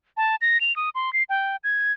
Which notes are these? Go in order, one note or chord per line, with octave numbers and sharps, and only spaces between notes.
A5
A#6
F7
D#6
C6
C7
G5
G#6